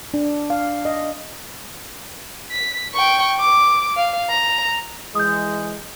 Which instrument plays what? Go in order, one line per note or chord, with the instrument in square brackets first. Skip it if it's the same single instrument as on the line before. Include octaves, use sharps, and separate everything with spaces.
[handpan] D4
F5
D#5
[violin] B6
G5 C#6
D6
F5
A#5
[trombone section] E3 G#3 [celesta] D#6 G6